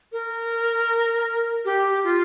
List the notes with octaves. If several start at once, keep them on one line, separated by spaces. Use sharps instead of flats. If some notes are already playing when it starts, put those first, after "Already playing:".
A#4
G4
F4